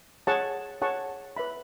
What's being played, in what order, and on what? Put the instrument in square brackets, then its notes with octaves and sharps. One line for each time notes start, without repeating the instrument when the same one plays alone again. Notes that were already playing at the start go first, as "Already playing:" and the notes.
[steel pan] G#4 C#5 F#5 A5 C#6
G#4 C#5 F#5 A5 C#6
B4 E5 B5